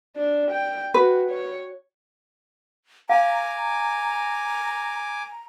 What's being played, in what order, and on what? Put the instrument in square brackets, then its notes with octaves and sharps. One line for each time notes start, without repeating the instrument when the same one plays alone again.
[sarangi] D4
G5
[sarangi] F#4 [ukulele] B4
[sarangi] C#5
[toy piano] F5 [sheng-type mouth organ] G#5 D6 [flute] A#5